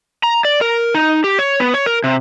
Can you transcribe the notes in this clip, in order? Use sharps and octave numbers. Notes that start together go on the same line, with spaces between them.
A#5
D5
A#4
D#4
G4
C#5
B3
C#5
A#4
C3